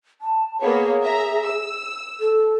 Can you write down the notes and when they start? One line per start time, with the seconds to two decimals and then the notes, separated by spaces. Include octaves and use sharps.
0.21 A5
0.62 A#3 B3 G#4 C#5
1.03 E5 A#5
1.44 E6
2.20 A4